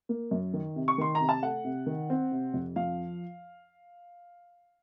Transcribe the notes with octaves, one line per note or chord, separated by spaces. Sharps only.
A#3
F#2
D#3
C3
C#6
D#3 C6
A#5
C3
A5
A3 F#5
C3
D#3
C4
C3
F2
F3 F5